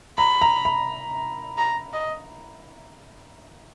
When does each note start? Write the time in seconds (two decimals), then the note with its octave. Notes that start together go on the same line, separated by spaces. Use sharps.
0.18 A#5 B5
0.42 A#5
0.65 B5
1.58 A#5
1.93 D#5